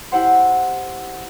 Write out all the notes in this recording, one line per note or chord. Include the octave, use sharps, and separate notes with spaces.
E4 G4 C5 F#5 C6